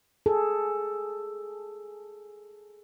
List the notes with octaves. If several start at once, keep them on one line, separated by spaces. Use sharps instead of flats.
G#4 A4